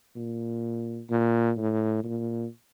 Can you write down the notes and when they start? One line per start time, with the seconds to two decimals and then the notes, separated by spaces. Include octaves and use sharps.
0.16 A#2
1.10 A#2
1.57 A2
2.03 A#2